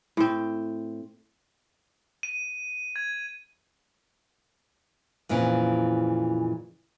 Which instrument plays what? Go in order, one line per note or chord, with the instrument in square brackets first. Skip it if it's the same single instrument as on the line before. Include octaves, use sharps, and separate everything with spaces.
[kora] A2 C4
[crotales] D#7
G#6
[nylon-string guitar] F2 A#2 C#3 E3